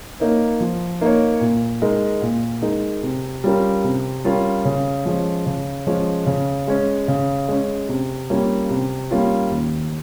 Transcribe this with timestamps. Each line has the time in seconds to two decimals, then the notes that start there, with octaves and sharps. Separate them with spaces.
0.20 A#3 D#4 A#4 C#5
0.61 F3
1.01 A#3 D#4 A#4 C#5
1.41 A#2
1.82 G#3 D#4 A#4
2.22 A#2
2.62 G#3 D#4 A#4
3.03 C3
3.44 G3 C#4 F4 A#4
3.84 C3
4.24 G3 C#4 F4 A#4
4.65 C#3
5.05 F3 G#3 C#4
5.46 C#3
5.87 F3 G#3 C#4
6.26 C#3
6.68 G#3 C#4
7.08 C#3
7.48 G#3 C#4
7.89 C3
8.30 G3 A#3 C#4 F4
8.70 C3
9.11 G3 A#3 C#4 F4
9.51 D#2